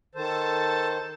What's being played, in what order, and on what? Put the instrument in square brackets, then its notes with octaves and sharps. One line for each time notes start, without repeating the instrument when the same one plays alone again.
[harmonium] D#3 C5 [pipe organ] A4 A5